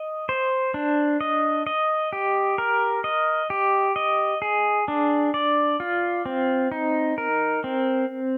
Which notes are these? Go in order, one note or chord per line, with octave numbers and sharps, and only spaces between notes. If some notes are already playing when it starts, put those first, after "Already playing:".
Already playing: D#5
C5
D4
D#5
D#5
G4
A#4
D#5
G4
D#5
G#4
D4
D5
F4
C4
D#4
A#4
C4